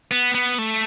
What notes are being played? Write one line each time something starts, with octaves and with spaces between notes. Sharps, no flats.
B3
B3
A3